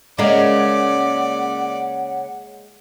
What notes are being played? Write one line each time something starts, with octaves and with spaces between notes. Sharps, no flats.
C#3 G#3 A#3 C#4 D5 F#5